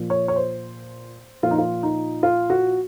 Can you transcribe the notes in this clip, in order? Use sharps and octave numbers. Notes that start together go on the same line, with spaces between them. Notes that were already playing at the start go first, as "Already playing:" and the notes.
Already playing: A#2 F3
C#5
C#5
C5
A#2 F3 F4
D#4
F4
D#4
F4
F#4